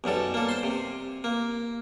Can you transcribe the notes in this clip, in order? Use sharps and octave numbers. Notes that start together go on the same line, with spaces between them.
B1 F#2 G3 A4
A#3 A4
C5 C6
C3
A#3